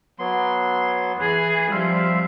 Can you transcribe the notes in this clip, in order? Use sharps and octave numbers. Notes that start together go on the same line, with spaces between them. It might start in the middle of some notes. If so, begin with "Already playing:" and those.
F#3 B3 C6
E3 G#4 B4
F3 G3 C4 E5 F5